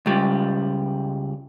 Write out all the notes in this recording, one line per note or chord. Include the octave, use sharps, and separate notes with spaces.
C#2 G3